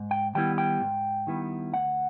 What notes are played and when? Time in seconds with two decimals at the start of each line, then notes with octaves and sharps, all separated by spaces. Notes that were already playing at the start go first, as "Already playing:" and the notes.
Already playing: G#2
0.11 G5
0.35 D#3 G3 B3 E4 G5
0.58 G5
0.81 G#2
1.27 D#3 G3 B3 E4
1.73 D2 F#5